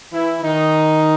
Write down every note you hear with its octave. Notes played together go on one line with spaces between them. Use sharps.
E3 E4
D#3 D#4